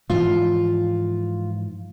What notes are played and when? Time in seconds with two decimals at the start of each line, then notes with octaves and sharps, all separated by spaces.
0.10 G#2 E3 F3 F4